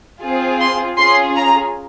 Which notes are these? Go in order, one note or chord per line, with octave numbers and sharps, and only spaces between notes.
C4 F4 G#4
C6
C#4 F4 G#4 C6
A#5